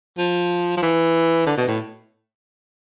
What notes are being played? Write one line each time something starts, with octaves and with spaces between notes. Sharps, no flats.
F3
F3
E3
D3
B2
A2